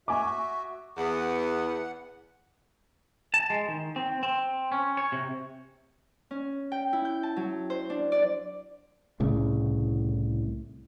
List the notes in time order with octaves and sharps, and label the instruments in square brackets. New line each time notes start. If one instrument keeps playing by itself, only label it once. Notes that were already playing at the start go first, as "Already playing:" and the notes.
[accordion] F#4 E5 [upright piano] G#5 D6
[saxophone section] E2 B3 [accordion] F#5
[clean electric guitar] A5
G#3
D#3
C4
C4
C#4
C#5
C3
[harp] C#4
G5
E4
G6
A5
F#3
C5
D4
D5
[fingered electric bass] C2 A2 C#3